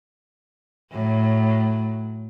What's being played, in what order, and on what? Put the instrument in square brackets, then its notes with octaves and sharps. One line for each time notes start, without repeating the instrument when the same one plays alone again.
[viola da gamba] A2 F#3